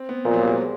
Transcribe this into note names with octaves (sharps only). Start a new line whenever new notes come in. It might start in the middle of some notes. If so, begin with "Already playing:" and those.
Already playing: C4
B3
A#2 F3
F#3
G3
G#3